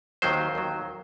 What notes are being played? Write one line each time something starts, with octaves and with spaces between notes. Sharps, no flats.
D#2 D#3 F#3 C5
D#2 D#3 F#3